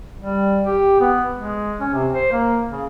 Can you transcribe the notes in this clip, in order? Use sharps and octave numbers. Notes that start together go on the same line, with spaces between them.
G3
G4
B3
G#3
C#4
C3
C5
A#3
C#3